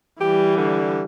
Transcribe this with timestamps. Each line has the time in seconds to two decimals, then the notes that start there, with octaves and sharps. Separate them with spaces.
0.20 E3 G3 G4
0.57 D3